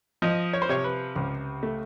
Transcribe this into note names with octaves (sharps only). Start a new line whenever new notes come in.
F3 D#5
C#5
C5
C3 C#5
B4
C#2 C5
A3